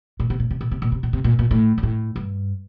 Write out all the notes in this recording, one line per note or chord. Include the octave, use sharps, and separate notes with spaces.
A#2
C3
A#2
C3
A#2
C3
A#2
C3
A#2
C3
A#2
A#2
A2
A#2
A2
G2